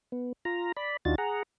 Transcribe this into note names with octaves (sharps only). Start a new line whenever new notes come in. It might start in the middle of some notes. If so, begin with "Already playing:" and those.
B3
F4 A#5
D5 B5
D#2 D4 D#4 F4 F#4 A6
G#4 F#5 A#5